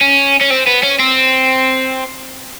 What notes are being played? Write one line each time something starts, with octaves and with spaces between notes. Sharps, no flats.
C#4
C#4
C4
B3
C#4
C4